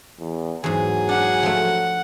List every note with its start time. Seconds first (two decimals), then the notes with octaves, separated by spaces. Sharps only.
0.19 E2
0.64 E2 G#2 F#3 G#4
1.09 D4 F#5
1.43 F3 A3